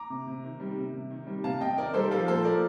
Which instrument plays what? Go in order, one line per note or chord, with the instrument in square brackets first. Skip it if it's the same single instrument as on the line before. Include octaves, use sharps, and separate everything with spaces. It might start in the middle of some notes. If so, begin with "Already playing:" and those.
Already playing: [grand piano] A#5 D6
C3
C3
D#3
G3
C3
C3
D#3
G3
C3 F5 A5
C3 D#5 G5
D#3 A#4 D5
G3 A4 C5
F3 F4 A4
A#2 A4 C5
F3 A#4 D5